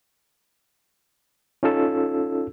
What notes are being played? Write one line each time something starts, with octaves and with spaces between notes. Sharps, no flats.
C#4 D#4 F4 A4 E6